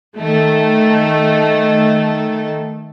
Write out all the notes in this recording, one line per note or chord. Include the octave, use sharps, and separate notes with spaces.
D#3 A3 A4